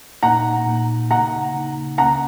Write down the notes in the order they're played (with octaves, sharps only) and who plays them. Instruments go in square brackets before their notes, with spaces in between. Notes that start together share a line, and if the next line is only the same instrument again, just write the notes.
[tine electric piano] A#2 A#3 D#4 [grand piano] F#5 A#5
[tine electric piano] A#2 A#3 D#4
[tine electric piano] C#3 A#3 D#4 [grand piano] F#5 A#5
[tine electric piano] C#3 A#3 D#4
[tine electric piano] C#2 C#3 A#3 C#4 [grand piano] F#5 A#5